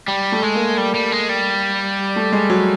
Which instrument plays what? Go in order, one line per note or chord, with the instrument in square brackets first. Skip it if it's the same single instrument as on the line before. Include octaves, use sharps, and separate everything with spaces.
[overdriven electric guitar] G3
[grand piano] A3
[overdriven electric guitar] G#3
[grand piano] A#3
[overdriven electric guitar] G3
G3
G#3
G3
[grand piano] A3
G#3
F#3